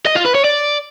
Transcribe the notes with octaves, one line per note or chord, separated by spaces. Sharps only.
D#5
F4
B4
C#5
D5